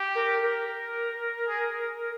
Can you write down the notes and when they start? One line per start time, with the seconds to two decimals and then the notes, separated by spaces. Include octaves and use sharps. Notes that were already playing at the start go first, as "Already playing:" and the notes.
Already playing: G4
0.15 A#4
0.41 A#4
1.48 G#4